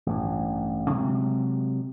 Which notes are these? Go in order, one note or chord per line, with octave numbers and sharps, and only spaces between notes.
A1 G2
C3 F#3 G#3